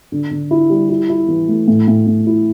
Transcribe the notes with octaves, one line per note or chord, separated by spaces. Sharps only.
D3
D3
E4
G3
E4
E4
E3
A3
A2
A2
A2
E4